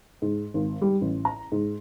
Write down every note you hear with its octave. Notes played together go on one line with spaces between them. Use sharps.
G#2
G#1
G3
A1
A#5
G#2